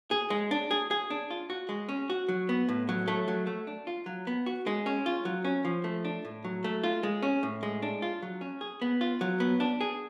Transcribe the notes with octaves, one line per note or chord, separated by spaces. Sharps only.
G#4
G#3
D4
G#4
G#4
D4
F4
F#4
G#3
C#4
F#4
F#3
B3
A2
F#3
A3
F#3
A3
D4
F4
F#3
B3
F#4
G#3
C#4
F4
F#3
C#4
F3
A3
D4
A2
F#3
A3
F4
G#3
C#4
A2
G#3
D4
F4
F#3
C#4
G#4
B3
F4
F#3
B3
D4
G#4